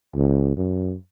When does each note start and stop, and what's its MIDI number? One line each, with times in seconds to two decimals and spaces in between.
0.15 0.55 37
0.57 0.95 42